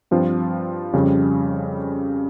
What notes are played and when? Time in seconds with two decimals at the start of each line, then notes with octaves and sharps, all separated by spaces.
0.11 G2 F3 C4 F4
0.93 F2 C#3 G3 C#4